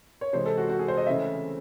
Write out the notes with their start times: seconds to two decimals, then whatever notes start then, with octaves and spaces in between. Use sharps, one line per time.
0.21 C#5
0.33 C3 E3 G#3 C5
0.46 A4
0.58 F#4
0.69 F#4
0.79 G#4
0.88 C5
0.97 D#5
1.07 C#3 E3 A3 C4 E5